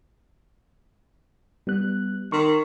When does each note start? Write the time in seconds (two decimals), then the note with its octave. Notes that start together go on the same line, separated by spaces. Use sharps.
1.67 G3 B3 F#6
2.32 D#3 C6 C#6